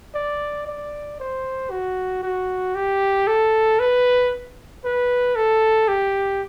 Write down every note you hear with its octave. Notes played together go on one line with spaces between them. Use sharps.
D5
D5
C5
F#4
F#4
G4
A4
B4
B4
A4
G4